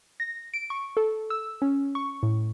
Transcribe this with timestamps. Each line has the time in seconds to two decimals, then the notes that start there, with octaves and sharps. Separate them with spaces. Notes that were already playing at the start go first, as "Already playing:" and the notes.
0.20 A#6
0.54 D7
0.70 C#6
0.97 A4
1.30 E6
1.62 C#4
1.95 C#6
2.23 A2